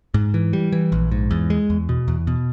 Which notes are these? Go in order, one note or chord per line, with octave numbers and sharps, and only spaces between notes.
G#2
E3
G3
E3
A#1
G#2
E2
G#3
E2
B2
E2
B2